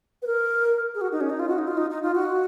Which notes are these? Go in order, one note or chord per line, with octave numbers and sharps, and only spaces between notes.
B4
A#4
G#4
F#4
D#4
C#4
D#4
F4
F#4
D#4
F4
D#4
D#4
F4
F#4